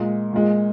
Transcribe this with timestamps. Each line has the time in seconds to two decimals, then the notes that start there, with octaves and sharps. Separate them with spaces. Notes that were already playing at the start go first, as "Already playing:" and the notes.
Already playing: A#2 G#3
0.33 A#2 G#3